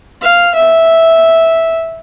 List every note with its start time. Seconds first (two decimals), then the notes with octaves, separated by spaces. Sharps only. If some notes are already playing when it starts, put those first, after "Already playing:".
0.22 F5
0.55 E5